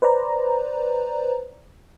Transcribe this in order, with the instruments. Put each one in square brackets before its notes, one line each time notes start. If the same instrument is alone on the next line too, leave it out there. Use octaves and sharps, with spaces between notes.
[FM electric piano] B4 C5 D5 A#5